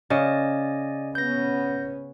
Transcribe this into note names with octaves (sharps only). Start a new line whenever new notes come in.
C#3 D5 D#5 G#5
B3 C#4 G6 A#6